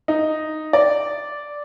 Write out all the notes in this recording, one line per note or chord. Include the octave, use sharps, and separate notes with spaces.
D#4
D5